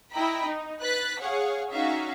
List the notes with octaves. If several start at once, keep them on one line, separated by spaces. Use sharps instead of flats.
E4 D#5 G5 A#5 B5
D#4
B4 F#6 A6 B6
G#4 C#5 F5 F#5
C#4 D#4 F#4 E5 F5